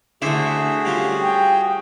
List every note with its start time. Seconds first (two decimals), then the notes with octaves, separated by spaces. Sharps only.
0.22 D3 A3 E4 F#4 G#4 C5 E5
0.85 G3 C#4 F4
1.22 G5